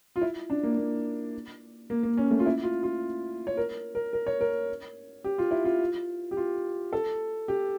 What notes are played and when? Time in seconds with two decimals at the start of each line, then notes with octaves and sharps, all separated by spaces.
0.16 F4
0.21 E4
0.50 D4
0.63 A#3
0.77 A#3
1.90 A#3
2.03 A#3
2.17 C#4
2.31 A3
2.39 F4
2.46 E4
2.64 F4
2.83 F4
3.47 C#5
3.57 A#4
3.95 A#4
4.13 A#4
4.27 C#5
4.41 A#4
5.24 G4
5.38 F4
5.51 E4
5.65 F4
6.31 G4
6.37 F4
6.93 A4
7.48 G4